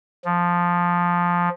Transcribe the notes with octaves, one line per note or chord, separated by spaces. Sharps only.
F3